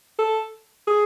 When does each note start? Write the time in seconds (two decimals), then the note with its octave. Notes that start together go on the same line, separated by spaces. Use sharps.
0.19 A4
0.88 G#4